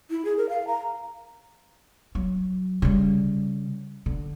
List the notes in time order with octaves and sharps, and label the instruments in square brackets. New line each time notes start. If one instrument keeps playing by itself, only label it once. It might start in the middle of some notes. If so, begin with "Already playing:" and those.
[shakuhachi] E4
G#4
A#4
F5
A#5
[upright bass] F#3
C#3 G3
D3